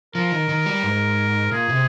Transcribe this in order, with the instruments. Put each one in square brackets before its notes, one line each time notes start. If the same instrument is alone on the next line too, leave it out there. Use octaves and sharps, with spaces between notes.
[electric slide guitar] F3 [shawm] A#4
[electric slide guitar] D#3
D#3
G3
G#2
[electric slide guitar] A#2 [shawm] G#4
[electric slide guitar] C3